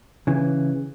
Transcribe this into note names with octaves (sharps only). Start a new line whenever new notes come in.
C#3 E3